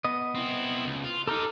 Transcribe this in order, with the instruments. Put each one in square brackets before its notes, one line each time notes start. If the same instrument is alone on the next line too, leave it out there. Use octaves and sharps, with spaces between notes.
[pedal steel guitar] B3 D#5
[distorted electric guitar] C4 E4
C#2
F4
[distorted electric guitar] D#4 G4 [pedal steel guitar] A4 A#5 F6